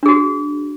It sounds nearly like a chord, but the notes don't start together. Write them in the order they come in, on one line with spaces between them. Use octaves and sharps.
D4 G#4 F#4